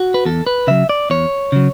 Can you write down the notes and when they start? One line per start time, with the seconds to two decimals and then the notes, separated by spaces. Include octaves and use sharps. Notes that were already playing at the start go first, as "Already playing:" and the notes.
Already playing: F#4
0.14 B4
0.25 E2 A4
0.47 B4
0.67 C#3 F#3 E5
0.89 D5
1.10 E2 C#5
1.52 C#3 F#3